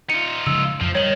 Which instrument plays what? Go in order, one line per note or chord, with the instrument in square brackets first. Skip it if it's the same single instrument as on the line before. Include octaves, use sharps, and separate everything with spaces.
[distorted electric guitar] D#4 F4 [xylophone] C#7
[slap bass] C#3 F3 G#3 [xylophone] E6
[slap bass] F2 [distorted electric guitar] F3
[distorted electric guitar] D#3 [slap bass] G3 [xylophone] C#5 F#7